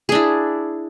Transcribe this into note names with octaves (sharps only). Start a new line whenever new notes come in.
D4 E4 G#4